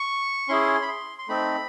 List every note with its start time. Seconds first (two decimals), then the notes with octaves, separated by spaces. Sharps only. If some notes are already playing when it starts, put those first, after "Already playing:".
Already playing: C#6
0.49 C#4 E4 G#4 C6
0.82 B5
0.88 C6
1.18 C6
1.28 A3 C4 D#4 B5